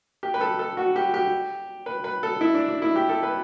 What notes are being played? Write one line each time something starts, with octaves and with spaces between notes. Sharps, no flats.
G4
B4
A4
A4
F#4
G4
G4
B4
B4
A4
E4
D4
D4
E4
G4
A4
B4